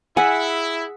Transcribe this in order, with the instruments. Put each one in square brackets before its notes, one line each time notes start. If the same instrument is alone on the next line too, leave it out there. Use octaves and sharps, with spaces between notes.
[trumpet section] E4 [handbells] G#4 E6 B6 [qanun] F#5 [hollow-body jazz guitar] G#5